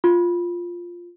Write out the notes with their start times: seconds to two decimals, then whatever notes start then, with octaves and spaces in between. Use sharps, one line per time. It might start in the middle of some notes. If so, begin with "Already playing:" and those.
0.04 F4